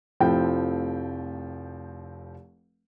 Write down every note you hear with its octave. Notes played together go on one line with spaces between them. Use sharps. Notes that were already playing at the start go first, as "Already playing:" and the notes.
F1 F3 A3 C4 E4 G5